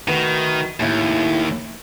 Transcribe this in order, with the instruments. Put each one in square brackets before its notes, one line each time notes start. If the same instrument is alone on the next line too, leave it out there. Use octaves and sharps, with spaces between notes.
[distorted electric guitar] D#3 [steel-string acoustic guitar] A3 F#4 B4
[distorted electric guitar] D#2 [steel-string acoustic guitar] A2 C#3 E4